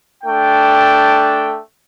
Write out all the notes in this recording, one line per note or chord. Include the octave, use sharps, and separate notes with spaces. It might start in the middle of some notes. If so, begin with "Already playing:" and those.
A3 D4 G5